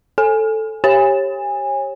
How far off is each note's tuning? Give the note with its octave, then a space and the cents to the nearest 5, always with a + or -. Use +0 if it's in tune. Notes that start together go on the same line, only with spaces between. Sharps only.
A4 +0 G#5 +0
G4 +0 C#5 -25 G#5 -25